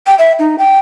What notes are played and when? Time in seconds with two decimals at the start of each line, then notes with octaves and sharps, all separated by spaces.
0.07 G5
0.19 E5
0.39 D#4
0.58 G5